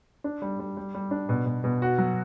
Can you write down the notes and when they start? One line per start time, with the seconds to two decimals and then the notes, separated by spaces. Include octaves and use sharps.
0.24 D4
0.42 G3
0.59 G3
0.77 G3
0.95 G3
1.11 D4
1.29 B2
1.46 B2
1.64 B2
1.82 F#4
1.98 F#3